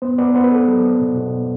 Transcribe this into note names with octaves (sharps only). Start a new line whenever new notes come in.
B3 C5
B3 D5
B3 C5
B4
B3 A4
F#3 A4
B3
B2
B2